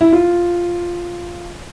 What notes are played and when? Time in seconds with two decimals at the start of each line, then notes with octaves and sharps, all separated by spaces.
0.01 E4
0.13 F4